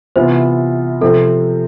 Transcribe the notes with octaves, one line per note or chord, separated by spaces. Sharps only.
C3 E3 B3 F4 C5
C3 F3 C4 A4